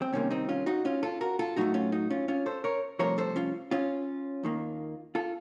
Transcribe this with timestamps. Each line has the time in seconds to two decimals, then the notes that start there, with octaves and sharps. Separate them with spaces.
0.02 C4
0.12 C2 C3 D#3 A#3 C#4
0.30 C4 D#4
0.49 C#4 F4
0.66 D#4 F#4
0.85 C#4 F4
1.03 F4 A4
1.21 F#4 A#4
1.39 F4 A4
1.56 A2 F#3 A3 D#4 F#4
1.74 C#4 F4
1.92 D#4 F#4
2.10 C#4 F4
2.28 C#4 F4
2.46 A4 C5
2.64 A#4 C#5
2.99 C2 C3 F3 A3 A#4 C#5
3.18 A4 C5
3.36 C#4 F4
3.71 C#4 F4
4.43 D#2 D#3 A#3
5.15 F4 A4